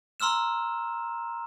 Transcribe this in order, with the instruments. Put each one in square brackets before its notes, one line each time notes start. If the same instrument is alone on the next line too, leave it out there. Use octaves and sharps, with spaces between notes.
[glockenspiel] A#5 C6 E6 F6 E7